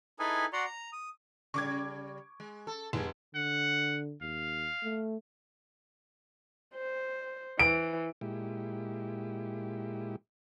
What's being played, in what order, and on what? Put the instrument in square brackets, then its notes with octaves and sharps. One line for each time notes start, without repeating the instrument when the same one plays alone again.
[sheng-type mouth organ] D#4 E4 G#4 A4 B4 G#5
F#4 D5 F#5 A#5 C6
A#5
D#6
[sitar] C#3 G3 [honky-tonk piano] C#6 D6 G#6
[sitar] G#3
A4
[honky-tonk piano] F1 [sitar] G#3 G#4
[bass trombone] D3 [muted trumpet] F#5
[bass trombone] D#2 [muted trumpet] F5
[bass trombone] A3
[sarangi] C5
[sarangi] E3 [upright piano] D7
[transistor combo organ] A#2 G#3 E4 G4